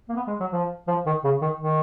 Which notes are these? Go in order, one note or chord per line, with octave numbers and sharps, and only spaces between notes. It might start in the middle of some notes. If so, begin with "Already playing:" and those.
A#3
B3
G#3
F#3
F3
F3
D#3
C#3
D#3
D#3